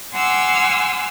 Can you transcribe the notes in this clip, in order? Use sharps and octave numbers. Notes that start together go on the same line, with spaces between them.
F#5 G#5 C6 D6 E6 F6